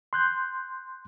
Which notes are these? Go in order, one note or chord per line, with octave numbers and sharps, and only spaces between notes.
C6 F#6 G6